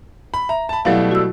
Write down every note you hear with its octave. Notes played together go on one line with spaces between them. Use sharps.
B5
E5 A#5
A5 B5
B2 F#3 G3 A3 E4 F5
F#4 E6